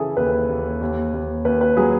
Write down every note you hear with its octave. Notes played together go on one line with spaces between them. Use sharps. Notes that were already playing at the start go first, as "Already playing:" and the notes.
Already playing: C#3 E3 G#4 A4 E5
D#2 B4
D#2
D#2
D#2
D#2 B4
B4
F#3 G#4